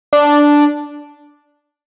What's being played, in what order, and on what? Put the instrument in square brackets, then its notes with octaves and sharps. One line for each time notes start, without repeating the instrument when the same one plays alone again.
[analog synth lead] D4